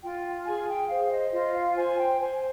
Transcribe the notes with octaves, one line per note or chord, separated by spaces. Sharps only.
F4 G5
G#4 G#5
G5
C5 F5
D#5
F4 D#5
F5
C5 G#5
G5
C5 G#5